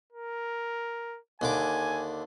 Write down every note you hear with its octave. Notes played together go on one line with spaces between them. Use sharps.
A#4
D#2 D3 G#5 D6